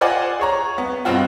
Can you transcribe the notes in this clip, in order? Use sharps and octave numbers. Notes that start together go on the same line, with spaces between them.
F4 C5 D5 D#5 F#5 G#5
G#4 C#5 A#5
B3
G2 B2 C4 F4 F#4